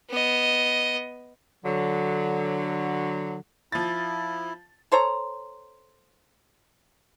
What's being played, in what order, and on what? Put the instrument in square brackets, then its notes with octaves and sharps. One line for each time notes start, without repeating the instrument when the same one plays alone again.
[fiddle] B3 D#5
[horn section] D3 F#3
[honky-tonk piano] F3 A6 [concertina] E4
[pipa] A4 C5 C#5 A#5